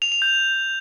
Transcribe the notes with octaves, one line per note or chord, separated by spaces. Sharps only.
F7
F7
G6